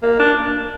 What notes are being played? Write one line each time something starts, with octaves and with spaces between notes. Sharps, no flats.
A#3
D4